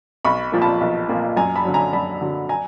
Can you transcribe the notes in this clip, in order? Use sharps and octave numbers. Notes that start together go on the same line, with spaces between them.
B1 B5 C#6
A#2 F3 A#3
A5 B5
B1
A#2 F3 A#3
F#2 G#5 A#5
A5 B5
D3 F#3
G#5 A#5
F#2 A5 B5
D3 F#3
G#5 A#5